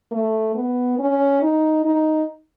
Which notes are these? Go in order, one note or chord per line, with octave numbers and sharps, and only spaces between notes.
A3
B3
C#4
D#4
D#4